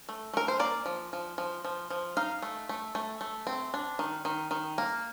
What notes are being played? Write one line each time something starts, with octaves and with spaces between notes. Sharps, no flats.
A3
A3 A#4
C5
A#3 D5
F3
F3
F3
F3
F3
D#4 F5
A3
A3
A3
A3
C4
D4
D#3
D#3
D#3
A#3